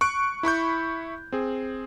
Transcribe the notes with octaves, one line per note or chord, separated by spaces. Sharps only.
C#6 F#6 D7
E4 B5 C#6 G6
C4 G#4